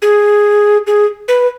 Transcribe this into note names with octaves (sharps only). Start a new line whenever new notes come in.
G#4
G#4
B4